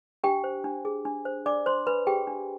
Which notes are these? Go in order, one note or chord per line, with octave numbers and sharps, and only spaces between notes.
D4 G4 G5
C5
D4
G#4
D4
C5
D4 D5 D6
C5 C6
D4 B4 B5
G4 G#4 G5
D4